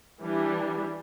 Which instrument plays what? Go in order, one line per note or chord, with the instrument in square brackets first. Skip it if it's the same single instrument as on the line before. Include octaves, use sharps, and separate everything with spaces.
[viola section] E3 G3 D4